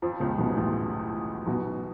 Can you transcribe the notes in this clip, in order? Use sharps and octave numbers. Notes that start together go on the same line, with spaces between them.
F2 F3
C#2 C#3
B1 B2
A1 A2
B1 B2